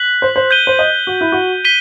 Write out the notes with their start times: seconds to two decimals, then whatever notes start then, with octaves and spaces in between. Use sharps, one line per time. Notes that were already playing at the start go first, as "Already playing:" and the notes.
Already playing: F#6 B6 F#7
0.22 C5
0.36 C5
0.51 G6 D#7 G7
0.67 C5
0.79 D#5
1.07 F#4
1.21 E4
1.32 F#4
1.65 B6 D#7 G7